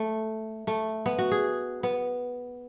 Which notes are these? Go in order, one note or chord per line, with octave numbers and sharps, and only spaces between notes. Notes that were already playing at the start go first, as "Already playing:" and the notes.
Already playing: A3
A3
B3
F#4
G#4
B3